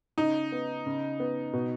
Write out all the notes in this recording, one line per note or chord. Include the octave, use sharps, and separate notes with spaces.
C#3 D#4
B3
C#3
B3
B2